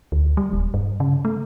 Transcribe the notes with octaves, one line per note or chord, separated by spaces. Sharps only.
D2
G3
D#1
G2
C#3
A3